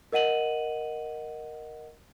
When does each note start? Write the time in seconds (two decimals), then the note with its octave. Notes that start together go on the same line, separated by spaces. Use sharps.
0.12 A#4 D#5 F#5 D#7 F#7